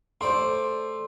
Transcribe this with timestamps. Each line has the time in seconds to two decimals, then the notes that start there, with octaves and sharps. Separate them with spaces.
0.21 A3 A4 C5 D5 C6